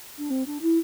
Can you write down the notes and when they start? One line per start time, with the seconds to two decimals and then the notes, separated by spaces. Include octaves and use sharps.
0.18 D4
0.30 C4
0.46 D4
0.62 E4